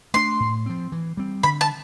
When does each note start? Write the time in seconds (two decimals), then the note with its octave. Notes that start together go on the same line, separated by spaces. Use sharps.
0.14 A3 D4 C6
0.40 A2
0.66 F3 C4
0.92 E3
1.17 G3 C4
1.43 D3 B5
1.61 A5